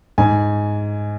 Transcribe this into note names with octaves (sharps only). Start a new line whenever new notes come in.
G#2 G#5